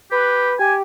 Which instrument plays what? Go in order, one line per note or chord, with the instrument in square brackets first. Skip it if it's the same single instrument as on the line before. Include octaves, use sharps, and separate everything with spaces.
[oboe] G4 [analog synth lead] B4
[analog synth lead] G4 [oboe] G#5